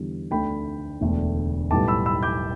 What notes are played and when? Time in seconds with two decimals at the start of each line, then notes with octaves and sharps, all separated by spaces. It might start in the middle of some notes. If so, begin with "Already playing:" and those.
Already playing: E2 D3 G3 B3
0.31 D2 D3 A3 G5 B5
1.01 E1 D2 D3 A3
1.71 B1 A2 G3 B3 A5 D6
1.88 B5 E6
2.06 B5 E6
2.23 D6 G6